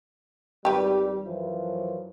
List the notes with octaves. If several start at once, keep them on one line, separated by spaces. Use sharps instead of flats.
G#1 G3 G4 B4
F#2 E3 F3